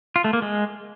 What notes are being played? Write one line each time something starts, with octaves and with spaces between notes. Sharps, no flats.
F4
A3
A#3
G#3